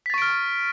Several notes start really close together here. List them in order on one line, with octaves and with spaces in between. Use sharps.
B6 A6 C#6 D7 F6